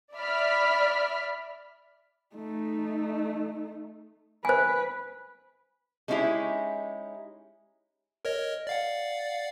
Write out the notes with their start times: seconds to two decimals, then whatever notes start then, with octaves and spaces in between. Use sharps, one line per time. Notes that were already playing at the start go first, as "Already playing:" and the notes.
0.15 D5 E5 B5 F6 B6
2.35 A3 D#4
4.45 B4 C5 G#5
6.08 G#3 C#4 D#4 E4 G4 G#4
8.25 A#4 C#5 D#5
8.67 D5 F5 F#5